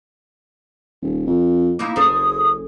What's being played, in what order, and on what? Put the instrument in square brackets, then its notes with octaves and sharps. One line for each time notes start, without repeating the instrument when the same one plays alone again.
[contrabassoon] D#1
F2
[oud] A#3 D#4 E4 [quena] D6
[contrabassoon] F#1 [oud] G#4 A4 C5 [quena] D#6